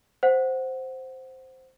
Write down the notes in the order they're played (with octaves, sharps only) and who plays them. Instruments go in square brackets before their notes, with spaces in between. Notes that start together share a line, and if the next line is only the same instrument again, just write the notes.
[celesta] C5 F#5